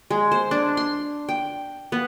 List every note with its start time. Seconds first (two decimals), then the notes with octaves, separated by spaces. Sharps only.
0.11 G#3
0.32 C5
0.51 D4
0.77 C6
1.29 G5
1.92 B3